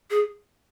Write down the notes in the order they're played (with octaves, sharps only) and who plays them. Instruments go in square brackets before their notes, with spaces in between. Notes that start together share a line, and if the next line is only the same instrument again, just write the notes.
[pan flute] G#4